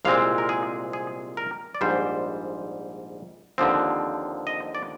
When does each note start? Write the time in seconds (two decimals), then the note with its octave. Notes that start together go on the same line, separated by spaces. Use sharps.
0.05 C2 A#2 G#3 C4 F5
0.38 A#4
0.49 G#4
0.93 G#4
1.37 A#4
1.75 D5
1.81 A#1 G#2 G3 C5
3.58 D#2 D3 F3 C4
4.47 D#5
4.75 D5